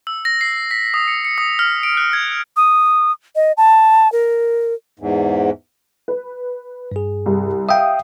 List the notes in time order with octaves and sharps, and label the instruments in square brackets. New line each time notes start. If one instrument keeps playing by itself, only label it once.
[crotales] E6
A#6
C7
B6
D#6
C#7
C#7
D#6
F6
D7
F#6
G#6
[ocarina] D#6
D#5
A5
A#4
[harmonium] E2 G#2
[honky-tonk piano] B4
[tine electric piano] G2 G#4
[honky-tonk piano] C2
[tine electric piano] E5 G5 [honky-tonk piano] F5 D#6